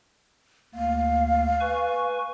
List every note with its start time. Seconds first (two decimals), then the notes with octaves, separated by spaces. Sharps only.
0.74 D2 A#3 F5
1.60 B4 G#5 C#6